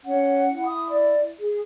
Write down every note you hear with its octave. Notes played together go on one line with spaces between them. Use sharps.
C#4 F#5
E4
D#6
D5
G#4